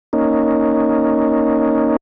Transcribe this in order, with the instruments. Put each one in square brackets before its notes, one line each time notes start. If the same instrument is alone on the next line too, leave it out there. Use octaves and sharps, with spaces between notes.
[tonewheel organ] A#3 C#4 D#4